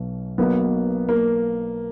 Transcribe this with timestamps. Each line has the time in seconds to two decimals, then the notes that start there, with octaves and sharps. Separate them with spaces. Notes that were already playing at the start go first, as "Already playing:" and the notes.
Already playing: B1 B2 F#3
0.38 B1 B2 F#3 A#3 B3
1.09 A#3